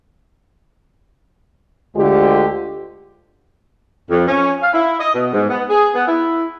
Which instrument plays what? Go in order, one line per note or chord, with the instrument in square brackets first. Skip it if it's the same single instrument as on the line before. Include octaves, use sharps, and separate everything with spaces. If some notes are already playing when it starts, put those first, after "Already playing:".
[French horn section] D2 D3 G#3 F4 G4
[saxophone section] F2
C#4
F5
E4
D#5
B2
G#2
B3
G#4
B3
E4